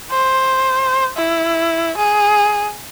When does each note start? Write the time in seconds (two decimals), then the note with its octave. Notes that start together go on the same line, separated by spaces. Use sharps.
0.11 C5
1.17 E4
1.97 G#4